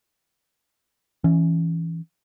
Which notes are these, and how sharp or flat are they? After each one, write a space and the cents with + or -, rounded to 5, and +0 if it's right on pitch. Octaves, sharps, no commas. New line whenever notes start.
E3 +0 C#4 +0